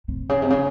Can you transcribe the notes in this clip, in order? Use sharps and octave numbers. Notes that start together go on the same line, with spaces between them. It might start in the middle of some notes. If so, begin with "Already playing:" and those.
C3
C#3
C3
C#3